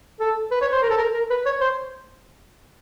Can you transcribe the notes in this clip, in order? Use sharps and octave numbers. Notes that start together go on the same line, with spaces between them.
A4
B4
C#5
C5
A#4
A4
A#4
A#4
B4
C#5
C5